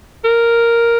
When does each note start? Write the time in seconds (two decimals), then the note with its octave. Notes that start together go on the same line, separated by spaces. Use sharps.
0.24 A#4